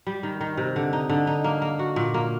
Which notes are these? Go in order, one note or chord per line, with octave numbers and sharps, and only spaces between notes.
G3
D#3
D#3
C3
D3
D#4
D3
D#4
A#3
A#3
F#4
A#2
A#3